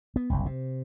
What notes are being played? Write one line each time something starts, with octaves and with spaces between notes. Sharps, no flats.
B3
F#1 C2
C3